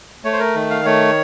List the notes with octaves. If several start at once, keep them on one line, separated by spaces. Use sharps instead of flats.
A3 C#5
C5
A#4
D#3
F5
A3 C#5